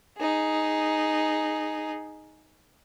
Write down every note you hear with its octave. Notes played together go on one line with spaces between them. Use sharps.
D#4 G#4